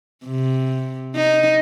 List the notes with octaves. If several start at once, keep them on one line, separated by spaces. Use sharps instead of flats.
C3
D#4